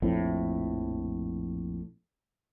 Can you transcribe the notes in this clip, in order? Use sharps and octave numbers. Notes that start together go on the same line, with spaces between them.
A#1 F2 A2